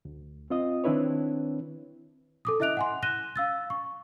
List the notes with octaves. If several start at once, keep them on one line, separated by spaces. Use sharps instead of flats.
D2
C4 F4 D#5 D#6
D#3 C4 D4 E4 B4 C#5
A4 D6 D#6
E4 D#5 E5 F#6 D7 F7
F#5 G#5 C6
F#6 A#6 D#7 E7 G7
F5 E6 A6
C#6